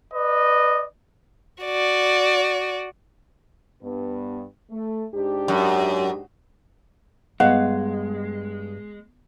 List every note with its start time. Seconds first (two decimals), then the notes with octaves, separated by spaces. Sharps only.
0.14 B4 D5 D#5
1.63 F#4 D5
3.82 G2 B3
4.71 A3
5.13 G#2 D4 G4
5.48 F#2
7.40 G2 G#3 B3 D#5 F5 F#5